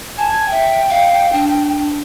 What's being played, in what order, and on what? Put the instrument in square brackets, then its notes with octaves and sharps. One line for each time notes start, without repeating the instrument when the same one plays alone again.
[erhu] G#5 [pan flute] A5
[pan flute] E5 [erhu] G5
[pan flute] F5
D4